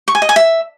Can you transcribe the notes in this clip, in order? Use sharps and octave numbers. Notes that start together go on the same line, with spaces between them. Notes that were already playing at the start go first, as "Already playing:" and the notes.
C#6
G#5
D#5
G#5
E5